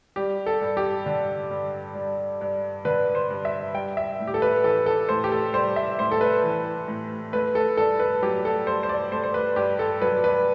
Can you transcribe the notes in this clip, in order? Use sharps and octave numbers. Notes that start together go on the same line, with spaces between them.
G3 G4
A4
G2
G4
D3
G2
G3
G2
D3 B4
C5
G2
E5
G3 G5
E5
A2
G4
A4
B4
E3 A4
A4
A2 C5
G4
A4
G3 C5
E5
A2 C5
A4
B4
E3
A2
A3 B4
A4
G2 A4
B4
F#3 G4
A4
G2 C5
C5
D5
A3 C5
C5
B4
G2 G4
A4
F#3 B4
B4